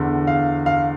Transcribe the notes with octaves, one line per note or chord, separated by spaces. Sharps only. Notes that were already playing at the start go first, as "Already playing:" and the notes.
Already playing: E2 D3
F5
F5